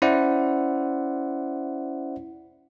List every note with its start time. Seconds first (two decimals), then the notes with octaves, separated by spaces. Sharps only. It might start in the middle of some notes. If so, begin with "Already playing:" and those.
0.02 C#4 E4 C5 D5 E5 F#5